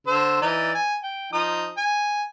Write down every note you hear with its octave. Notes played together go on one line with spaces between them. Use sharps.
D3 C5 E6
E3 D#4 D5
G#5
G5
F3 D#4 D#6
G#5